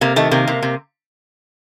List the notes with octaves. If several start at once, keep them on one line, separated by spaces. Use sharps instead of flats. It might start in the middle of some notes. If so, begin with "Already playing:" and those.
C3 A#3
D#3 A3
C3 A#3
C3
C3